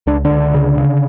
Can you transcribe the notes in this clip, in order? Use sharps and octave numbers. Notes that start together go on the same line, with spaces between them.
C#2 D4
D3 D4
C#2
C#3
C#3